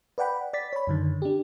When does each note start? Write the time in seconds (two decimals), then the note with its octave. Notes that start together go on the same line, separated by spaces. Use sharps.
0.18 B4 D5 F#5 G5 B5
0.53 D5 A6 B6
0.73 C#5 B5
0.87 F#2 D3 D#3
1.22 D4 G4